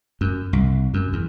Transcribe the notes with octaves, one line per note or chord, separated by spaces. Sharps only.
F#2
C2
F#2
E2